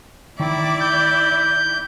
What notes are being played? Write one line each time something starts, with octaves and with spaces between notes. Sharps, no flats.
D#3 E4 D5
G6